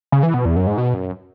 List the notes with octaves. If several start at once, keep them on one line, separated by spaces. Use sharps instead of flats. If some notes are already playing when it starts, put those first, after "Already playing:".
C#3
E3
B2
E2
F#2
G#2
B2
F#2